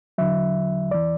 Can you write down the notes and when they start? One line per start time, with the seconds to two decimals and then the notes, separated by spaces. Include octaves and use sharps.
0.18 E2 D3 F#3 E5
0.90 E2 E3 D5